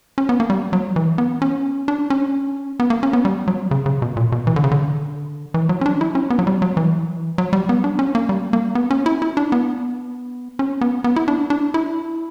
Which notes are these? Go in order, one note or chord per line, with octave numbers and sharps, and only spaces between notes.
C#4
B3
A#3
G3
F#3
E3
B3
C#4
D4
C#4
B3
A#3
C#4
B3
G3
F#3
C#3
C#3
B2
A#2
B2
E3
D3
C#3
D3
E3
F#3
C#4
D4
E4
C#4
B3
F#3
G3
F#3
E3
F#3
G3
B3
D4
C#4
A#3
G3
A#3
B3
C#4
E4
E4
D4
B3
C#4
B3
B3
E4
D4
D4
E4